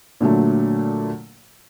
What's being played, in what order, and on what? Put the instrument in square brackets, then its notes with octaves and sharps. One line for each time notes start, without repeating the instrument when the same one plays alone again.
[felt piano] A#2 D3 F#3 A3